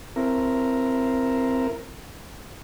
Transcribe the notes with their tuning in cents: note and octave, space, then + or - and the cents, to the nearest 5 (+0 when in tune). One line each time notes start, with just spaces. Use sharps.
C4 -5 E4 +30 A#4 +0